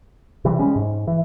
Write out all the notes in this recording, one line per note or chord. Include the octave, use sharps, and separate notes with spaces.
C3 E3 G3
G3 G#3 C#4
G#2
E3